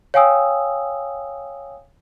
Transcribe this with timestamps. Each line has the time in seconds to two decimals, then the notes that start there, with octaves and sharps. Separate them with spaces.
0.14 C#5 F5 G5 G#5 D#6 E6